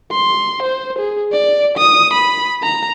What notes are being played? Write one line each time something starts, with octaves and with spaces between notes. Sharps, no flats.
C6
C5
G#4
D5
D#6
B5
A#5